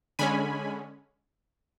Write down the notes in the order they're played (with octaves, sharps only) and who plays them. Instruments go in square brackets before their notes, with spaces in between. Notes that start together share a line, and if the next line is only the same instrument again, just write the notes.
[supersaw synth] D3 G#3 C#4 G#5 B5